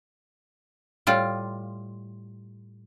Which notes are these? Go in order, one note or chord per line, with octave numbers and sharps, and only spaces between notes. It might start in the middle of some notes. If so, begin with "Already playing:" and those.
A2 G3 F4